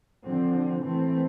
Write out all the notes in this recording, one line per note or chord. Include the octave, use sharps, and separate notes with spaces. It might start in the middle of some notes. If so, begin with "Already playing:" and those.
D3 F3 C4
E3 A3 C4